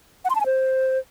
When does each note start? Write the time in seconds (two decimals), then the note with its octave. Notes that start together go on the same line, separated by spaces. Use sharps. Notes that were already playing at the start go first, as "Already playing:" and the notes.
0.25 F#5
0.30 C6
0.35 A5
0.41 G#5
0.46 C5